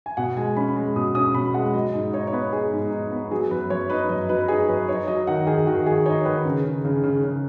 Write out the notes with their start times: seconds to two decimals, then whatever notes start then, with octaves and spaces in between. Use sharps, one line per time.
0.06 G#5
0.17 B2 F#5
0.37 G#3 G#5
0.57 C#4 B5
0.76 G#3
0.96 B2 D#6
1.15 C#4 D#6
1.34 B2 B5
1.54 G#3 F#5
1.74 F#3 D#5
1.94 G#2
2.13 D#4 C#5
2.27 C#5
2.33 B3 B4
2.52 D#4 G#4
2.72 G#2
2.92 D#4
3.12 B3
3.31 F#3 G#4
3.50 F#2 B4
3.70 F#2 C#5
3.90 D#4 B4
4.09 F#2 D#5
4.29 F#3 B4
4.48 D#4 G#4
4.68 F#2 B4
4.88 D#4 C#5
5.08 F#3 D#5
5.27 D#3 F#5
5.47 D#3 G#4
5.67 D#3 F#4
5.86 D#3 G#4
6.06 D#4 C#5
6.25 D#3 B4
6.45 C#3
6.64 C#3
6.85 C#3
7.04 C#3
7.24 C#3